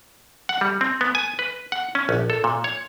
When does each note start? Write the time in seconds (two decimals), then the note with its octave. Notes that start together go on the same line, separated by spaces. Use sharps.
0.49 F#5
0.61 G3
0.81 C4
1.01 B3
1.15 G#5
1.39 B4
1.72 F#5
1.95 C#4
2.09 A#1
2.30 A4
2.44 A#2
2.64 C#5